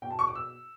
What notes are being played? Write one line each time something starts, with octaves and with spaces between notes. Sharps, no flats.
B2 G5
A5
C#6
D6
E6